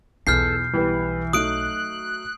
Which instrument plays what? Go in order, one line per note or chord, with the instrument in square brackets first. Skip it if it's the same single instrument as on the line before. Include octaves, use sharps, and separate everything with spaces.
[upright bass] B1 [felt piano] E2 [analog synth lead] A4 [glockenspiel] F6 G6 C7
[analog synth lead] E3 [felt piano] G3 B3
[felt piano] F#3 A3 D#4 [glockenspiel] D#6 D7 [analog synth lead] F#6